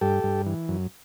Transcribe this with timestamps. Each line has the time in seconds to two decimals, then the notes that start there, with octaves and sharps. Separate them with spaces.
0.01 G2 G4 A4
0.24 G2
0.46 E3
0.68 F#2